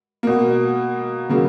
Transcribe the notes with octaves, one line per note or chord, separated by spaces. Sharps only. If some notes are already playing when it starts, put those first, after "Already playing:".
B2 A#3
C#3 F#3 A#3